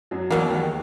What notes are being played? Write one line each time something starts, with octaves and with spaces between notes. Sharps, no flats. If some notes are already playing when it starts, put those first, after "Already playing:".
F#2 F#3
E2 B2 E3 F#3 A#3
D#2 D#3